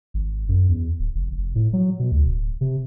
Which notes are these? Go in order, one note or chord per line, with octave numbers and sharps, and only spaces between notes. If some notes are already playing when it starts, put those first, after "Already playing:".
G#1
F#2
E2
D1
F1
F1
A2
F#3
B2
D2
D1
C3